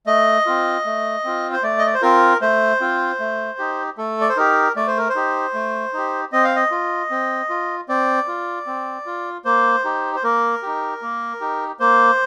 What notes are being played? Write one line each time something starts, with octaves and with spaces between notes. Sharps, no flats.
A3 D#5
C4 F4
A3
C4 F4
C5
A3 D5
D#5
D5
C5
C4 F4 A#4
A3 C5
C4 F4
A3
D#4 G4
A3 A4
D5
C5
D#4 G4 A#4
A3 D5
C5
A#4
C5
D#4 G4
A3
D#4 G4
C4 D#5
F5
D#5
F4
C4
F4
C4 D5
F4
C4
F4
A#3 C5
D#4 G4
C5
A#3 A#4
D#4 G4
A#3
D#4 G4
A#3 C5